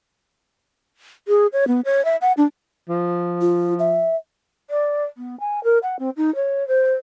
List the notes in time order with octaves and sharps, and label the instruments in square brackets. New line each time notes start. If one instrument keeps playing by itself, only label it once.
[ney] G#4
C#5
B3
C#5
E5
F#5
D4
[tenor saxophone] F3
[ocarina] F4
E5
[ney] D5
B3
G#5
A#4
F#5
C4
D#4
C#5
C5